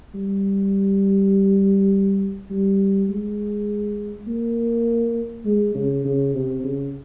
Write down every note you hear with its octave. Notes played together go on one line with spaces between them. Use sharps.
G3
G3
G#3
A#3
G#3
C#3
C#3
C3
C#3